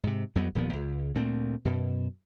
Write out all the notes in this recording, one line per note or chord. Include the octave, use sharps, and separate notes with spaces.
G#2 C3
F2 F#3 G3 B3
D#1 A#2 F3 B3
C#2
D2 A#2 A3 C4
F#2 B2